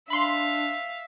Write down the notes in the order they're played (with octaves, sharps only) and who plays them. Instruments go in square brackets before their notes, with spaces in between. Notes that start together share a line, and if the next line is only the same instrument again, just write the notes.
[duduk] D4 [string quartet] E5 F5 [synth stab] B5 C6